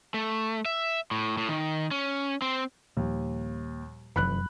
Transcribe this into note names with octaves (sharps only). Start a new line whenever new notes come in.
A3
E5
A2
A2
D#3
C#4
C4
D#2 A#2 F3 G3
F1 F#2 E3 B5 F#6